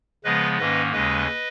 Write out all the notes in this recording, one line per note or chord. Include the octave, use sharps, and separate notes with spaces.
C#3 F3 G#3 B3 B4 D#5
G#2 D#3 A#3 C#4 B4 D#5
D#2 C#3 G#3 C#4 B4 D#5